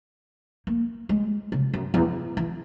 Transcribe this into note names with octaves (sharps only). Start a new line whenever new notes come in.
A#3
G#3
C#3
F#2
E2
E3